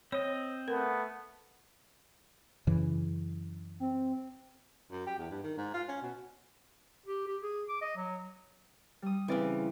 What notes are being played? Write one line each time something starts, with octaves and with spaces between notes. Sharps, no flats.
C4 C#5 D#5
A3 B3 A#4
F#2 C#3 E3
C4
F#2
G4
E2
G2
D#3
G#2
F4
C#4
B2
G4
G4
G#4
D6
D#5
F#3
G3 D#6
C#3 E3 C4 D5 F5